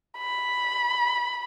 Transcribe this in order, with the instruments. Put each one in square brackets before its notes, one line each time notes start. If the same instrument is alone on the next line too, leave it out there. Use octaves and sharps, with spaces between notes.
[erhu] B5